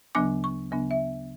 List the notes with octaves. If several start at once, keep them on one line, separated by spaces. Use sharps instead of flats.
D2 C#3 F#3 B3 D4 D6
C#6
D2 C#3 F#3 B3 D4
E5